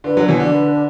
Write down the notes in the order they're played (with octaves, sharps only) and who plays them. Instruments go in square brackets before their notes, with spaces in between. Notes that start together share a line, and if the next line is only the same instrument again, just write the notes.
[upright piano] D3 [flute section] B4
[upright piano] D3 F#3
[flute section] F#4
[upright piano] B2 E3
[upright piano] D3 [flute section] D4
[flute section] B4
D4